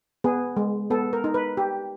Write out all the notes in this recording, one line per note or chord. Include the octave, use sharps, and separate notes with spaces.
B3 G#4
G#3
B3 A4
A#4
D#4
B4
G4